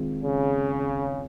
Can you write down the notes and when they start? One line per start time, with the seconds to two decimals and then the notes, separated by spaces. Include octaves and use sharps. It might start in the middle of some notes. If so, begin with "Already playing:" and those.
Already playing: C3 D#3 G#3 C4 F4
0.23 C#3